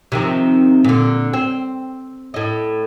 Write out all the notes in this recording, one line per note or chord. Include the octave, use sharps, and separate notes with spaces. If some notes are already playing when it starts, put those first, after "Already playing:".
C3 D#3 F3
A#2 D3
C4
A2 D#5